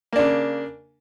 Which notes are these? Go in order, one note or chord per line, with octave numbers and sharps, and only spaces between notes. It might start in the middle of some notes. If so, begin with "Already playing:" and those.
C#3 A#3 D4